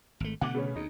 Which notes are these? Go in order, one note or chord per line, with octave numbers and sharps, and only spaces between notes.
G#1 A3
B2 D3 A3 F#5 D6
C#3 B3 C#4
D2 D#4